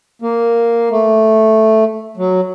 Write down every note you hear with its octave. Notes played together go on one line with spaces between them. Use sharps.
A#3
A3
F#3